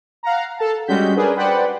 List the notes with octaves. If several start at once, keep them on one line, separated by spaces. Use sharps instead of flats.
F5 F#5 A#5
A4 A5
G3 G#3 C#4 F#4 G6 B6
D4 G#4 A#4 B4
B4 C5 D5 F#5 G5 B5